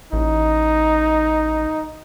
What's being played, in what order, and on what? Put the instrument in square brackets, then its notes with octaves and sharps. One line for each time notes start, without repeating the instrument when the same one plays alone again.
[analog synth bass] A1 [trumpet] D#4